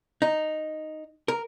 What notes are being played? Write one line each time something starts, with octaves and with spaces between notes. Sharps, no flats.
D#4
A#4